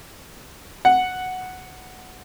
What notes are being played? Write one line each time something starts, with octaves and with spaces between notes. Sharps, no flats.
F#5